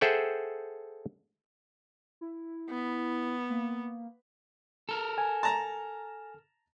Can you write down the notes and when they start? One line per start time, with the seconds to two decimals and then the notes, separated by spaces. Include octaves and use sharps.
0.01 G#4 A4 C5 E5 F#5 G5
2.21 E4
2.70 B3
3.50 A#3
4.89 A4 A#4
5.18 G#5
5.43 A5 A#5